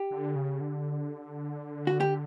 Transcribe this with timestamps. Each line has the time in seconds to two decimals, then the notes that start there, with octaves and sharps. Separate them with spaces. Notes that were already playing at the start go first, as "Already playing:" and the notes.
Already playing: G4
0.11 D3
0.36 C#3
0.61 D3
1.87 F#4
2.00 G4